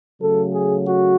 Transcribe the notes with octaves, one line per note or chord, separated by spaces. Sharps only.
C#3 F#3 A3 A4
G#4
F#4